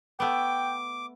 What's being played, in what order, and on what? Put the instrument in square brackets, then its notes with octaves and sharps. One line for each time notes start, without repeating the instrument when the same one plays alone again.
[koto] A3 B3 [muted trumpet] G5 [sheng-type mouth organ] D6